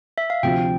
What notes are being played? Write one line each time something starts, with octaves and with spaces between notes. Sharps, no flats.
E5
F5
D2 C3 F3 G5